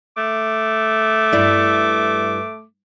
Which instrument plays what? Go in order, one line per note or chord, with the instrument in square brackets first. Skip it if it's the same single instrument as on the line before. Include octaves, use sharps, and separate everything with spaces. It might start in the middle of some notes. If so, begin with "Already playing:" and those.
[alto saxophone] A3 [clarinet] D6
[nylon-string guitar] G2 E4 D5